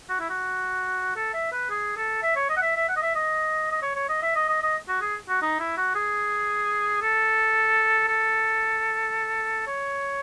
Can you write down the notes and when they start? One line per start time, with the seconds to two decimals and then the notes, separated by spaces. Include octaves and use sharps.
0.09 F#4
0.20 E4
0.30 F#4
1.16 A4
1.34 E5
1.52 B4
1.70 G#4
1.96 A4
2.23 E5
2.36 C#5
2.49 D#5
2.56 F#5
2.62 E5
2.76 E5
2.88 F#5
2.96 D#5
3.02 E5
3.15 D#5
3.72 D#5
3.82 C#5
3.96 C#5
4.09 D#5
4.22 E5
4.35 D#5
4.49 D#5
4.62 D#5
4.88 F#4
5.01 G#4
5.29 F#4
5.42 D#4
5.60 E4
5.77 F#4
5.95 G#4
7.01 A4
8.08 A4
9.67 C#5